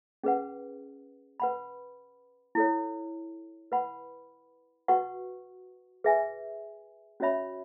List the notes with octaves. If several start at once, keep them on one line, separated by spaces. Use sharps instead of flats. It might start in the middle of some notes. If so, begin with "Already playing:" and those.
C#4 G#4 B4 F#5
B4 F#5 B5
E4 A4 C#5
B4 F#5 B5
F#4 B4 F#5 C#6
G#4 B4 E5 G#5
C#4 F#4 C#5 E5 B5